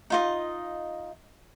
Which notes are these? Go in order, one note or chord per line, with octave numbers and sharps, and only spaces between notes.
D#4 F4 D#5